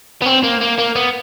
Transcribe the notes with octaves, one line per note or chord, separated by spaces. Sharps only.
B3
C4
A#3
A#3
A#3
B3